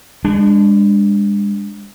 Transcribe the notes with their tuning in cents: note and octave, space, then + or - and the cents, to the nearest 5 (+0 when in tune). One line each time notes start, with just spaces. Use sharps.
G#3 -35 D4 +0